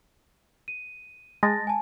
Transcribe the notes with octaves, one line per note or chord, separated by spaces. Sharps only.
D#7
G#3 A5 A6 A#6
G#5 A5